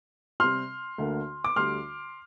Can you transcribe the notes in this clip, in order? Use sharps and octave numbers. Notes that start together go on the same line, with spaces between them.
C3 G3 C4 C6 F6
D2 D3 A#3
D6
D2 D3 G3 C6 F6